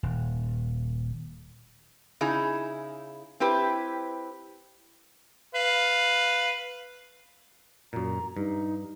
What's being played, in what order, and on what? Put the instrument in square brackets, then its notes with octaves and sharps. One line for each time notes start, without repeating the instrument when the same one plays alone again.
[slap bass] D#1
[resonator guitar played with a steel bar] C#3 D#4 E4 G#4
C4 E4 G4 B4
[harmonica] B4 F5
[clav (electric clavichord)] F#2 A#2 [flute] A#5
[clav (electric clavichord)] G2 [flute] D#4